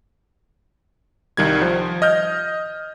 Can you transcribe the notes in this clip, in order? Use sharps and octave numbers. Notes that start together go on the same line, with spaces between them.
C2 D#3 G3 G#6
F3
D#5 F6 G6